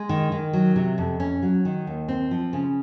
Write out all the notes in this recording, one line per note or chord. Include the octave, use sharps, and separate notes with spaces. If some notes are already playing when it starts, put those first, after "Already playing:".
Already playing: G#3
D#3
D#3
F#3
C3
F2
C#4
F#3
D#3
D#2
C4
F3
C#3